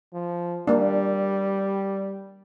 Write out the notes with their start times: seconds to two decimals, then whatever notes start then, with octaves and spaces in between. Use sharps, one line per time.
0.14 F3
0.67 G3 A#3 D4